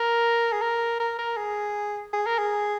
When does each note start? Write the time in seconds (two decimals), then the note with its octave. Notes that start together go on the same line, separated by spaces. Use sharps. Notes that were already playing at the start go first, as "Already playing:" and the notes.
Already playing: A#4
0.52 G#4
0.62 A#4
1.00 A#4
1.18 A#4
1.37 G#4
2.13 G#4
2.26 A#4
2.38 G#4